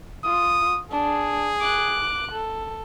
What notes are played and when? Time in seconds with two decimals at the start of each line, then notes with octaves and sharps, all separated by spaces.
0.25 F4 D#6
0.91 D4 G#4
1.61 D6 F#6
2.32 A4